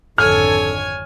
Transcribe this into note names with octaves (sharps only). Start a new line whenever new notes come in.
G#1 F2 D3 A4 C#5 G#5 F6 G#6